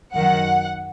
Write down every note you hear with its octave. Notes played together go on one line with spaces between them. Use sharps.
F#2 D#3 F#3 F#5